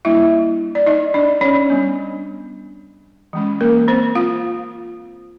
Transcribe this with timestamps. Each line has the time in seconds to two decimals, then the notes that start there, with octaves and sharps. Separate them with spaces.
0.05 G3 A#3 D4 E4 E5
0.75 D5
0.86 D#4 D#5
1.14 D4 D5
1.41 C#4 C#5
1.69 G3 B3 D4
3.33 E3 G#3 C#4
3.61 A#3 A#4
3.88 C4 C5
4.15 F4 F5